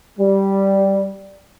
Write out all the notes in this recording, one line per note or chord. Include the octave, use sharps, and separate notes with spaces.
G3